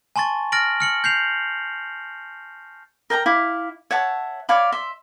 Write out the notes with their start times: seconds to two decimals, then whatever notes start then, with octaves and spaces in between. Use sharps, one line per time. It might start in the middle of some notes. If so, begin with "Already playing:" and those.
0.16 G#5 A5 C6 C#6 A6
0.52 F6 A6 A#6 D7 F#7
0.80 F6 C#7 F#7
1.04 G6 C7 F7
3.10 A#4 G5 A5 A#5
3.26 E4 F5 D6
3.91 C#5 E5 F#5 A5
4.49 C#5 D5 F5 B5
4.72 E5 C6